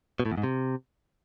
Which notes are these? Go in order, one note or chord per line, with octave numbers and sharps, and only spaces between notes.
B2
A2
E2
G#2
C3